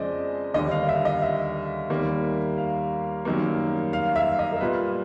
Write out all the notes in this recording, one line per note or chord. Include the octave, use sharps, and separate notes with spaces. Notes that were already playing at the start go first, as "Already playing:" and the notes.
Already playing: F2 C#3 G#3 C5 D5 D#5
D#2 D3 G3 D#5
F5
E5
D#5
E5
D#2 D#3 G3 A#3
F5
F#2 D#3 G3 A#3
F5
E5
D#5
A#4
A#2 G3 A#3 B4